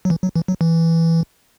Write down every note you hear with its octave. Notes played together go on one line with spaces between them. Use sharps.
F#3
E3
F#3
E3
F#3
E3